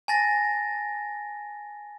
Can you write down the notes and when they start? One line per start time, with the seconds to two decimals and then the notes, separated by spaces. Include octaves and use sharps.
0.08 G#5 A5 A6 A#6